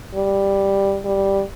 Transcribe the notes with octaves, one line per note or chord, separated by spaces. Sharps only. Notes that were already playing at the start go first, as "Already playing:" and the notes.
G3
G3